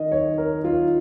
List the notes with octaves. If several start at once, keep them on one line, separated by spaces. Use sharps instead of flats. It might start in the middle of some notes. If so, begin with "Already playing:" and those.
Already playing: D#3 D#5
C#5
A#4
F4